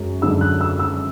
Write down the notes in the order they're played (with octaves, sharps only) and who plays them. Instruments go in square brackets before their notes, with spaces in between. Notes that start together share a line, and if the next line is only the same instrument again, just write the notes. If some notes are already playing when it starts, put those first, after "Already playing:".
Already playing: [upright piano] F#2 G#3
F#2 D3 G#3 E6
F#6
E6
E6